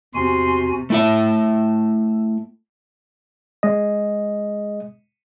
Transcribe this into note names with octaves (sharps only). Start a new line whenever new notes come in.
E2 C3 F#4 G#5 C6
A3 E4 E5
G#3 D#5